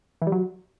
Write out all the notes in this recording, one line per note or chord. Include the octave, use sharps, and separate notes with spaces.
E3
G3
F#3